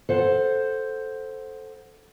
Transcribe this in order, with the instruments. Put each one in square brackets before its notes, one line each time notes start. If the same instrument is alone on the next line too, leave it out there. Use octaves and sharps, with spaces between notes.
[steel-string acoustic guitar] A4 C5 F#5